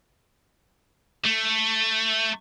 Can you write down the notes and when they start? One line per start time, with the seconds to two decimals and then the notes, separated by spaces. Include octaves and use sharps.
1.25 A3